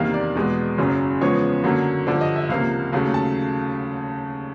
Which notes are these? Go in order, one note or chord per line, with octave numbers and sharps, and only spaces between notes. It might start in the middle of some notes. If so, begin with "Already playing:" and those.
Already playing: E2 C3 D#3 G3 A#3 F5
D5
E2 B2 G#3 B3
F#1 F#2 C#3 F#3
E2 C#3 F3 G#3 B3 C#5
F#2 D3 F#3 A#3
G2 D3 F3 D5
D#5
E5
C#2 C3 F3 A#3 F5
D#2 C#3 F#3 A3 F5
A5